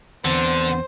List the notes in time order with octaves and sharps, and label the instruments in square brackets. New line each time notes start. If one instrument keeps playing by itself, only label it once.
[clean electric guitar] E2 B3 C4 [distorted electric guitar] D3 [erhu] C5